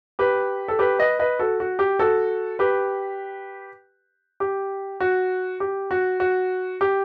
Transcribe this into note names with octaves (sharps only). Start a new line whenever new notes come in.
G4 B4
A4
G4 B4
B4 D#5
B4 D#5
F#4 A4
F#4
G4
F#4 A4
G4 B4
G4
F#4
G4
F#4
F#4
G4